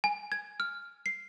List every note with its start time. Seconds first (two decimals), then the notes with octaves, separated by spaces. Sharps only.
0.04 G#5
0.32 G#6
0.60 F6
1.06 C7